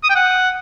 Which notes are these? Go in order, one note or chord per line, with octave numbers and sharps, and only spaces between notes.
D#6
G5
F#5